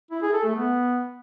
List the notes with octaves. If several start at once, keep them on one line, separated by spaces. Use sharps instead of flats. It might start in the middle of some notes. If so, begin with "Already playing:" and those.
E4
G#4
A4
A3
B3